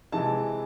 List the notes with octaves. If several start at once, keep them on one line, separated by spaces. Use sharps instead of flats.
C3 E3 G#3 A5